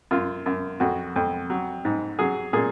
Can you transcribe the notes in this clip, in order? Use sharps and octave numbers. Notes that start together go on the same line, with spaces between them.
F#2 F4
F#2
F2 F#4
F2
F#3
G#2
F#3 G#4
A#2 G#4